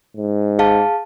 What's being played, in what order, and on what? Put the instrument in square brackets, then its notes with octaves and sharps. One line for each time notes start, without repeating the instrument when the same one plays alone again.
[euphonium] G#2
[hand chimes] G#4 F5 A5